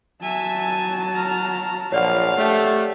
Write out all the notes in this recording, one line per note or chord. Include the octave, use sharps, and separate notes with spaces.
F#3 E5 G#5 A5
G#5
A#5 F6
A#1 C#5 D5 F5 F#5
A3 G4